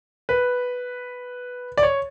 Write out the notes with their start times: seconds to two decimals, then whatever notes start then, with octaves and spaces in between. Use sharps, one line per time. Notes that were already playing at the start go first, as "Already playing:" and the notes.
0.29 B4
1.78 D5
1.83 C#5